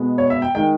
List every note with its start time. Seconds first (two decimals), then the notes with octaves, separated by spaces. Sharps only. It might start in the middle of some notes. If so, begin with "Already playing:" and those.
Already playing: B2 G#3 B3
0.18 C#5
0.30 E5
0.42 G5
0.55 D#3 G#3 G5